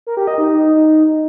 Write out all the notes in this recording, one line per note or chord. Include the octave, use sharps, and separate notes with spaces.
A#4
G4
D#5
D#4
D#4